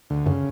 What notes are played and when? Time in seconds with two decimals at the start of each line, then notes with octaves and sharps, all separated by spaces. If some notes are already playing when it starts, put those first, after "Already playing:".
0.10 D2
0.26 F#2 C#3